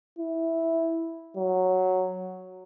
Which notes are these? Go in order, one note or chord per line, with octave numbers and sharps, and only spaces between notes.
E4
F#3